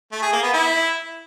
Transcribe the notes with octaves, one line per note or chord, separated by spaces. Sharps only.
A3
G#4
A#3
B3
E4